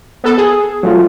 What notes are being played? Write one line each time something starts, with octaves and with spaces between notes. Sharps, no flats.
B3 A4
G#4
F#3 A3 F4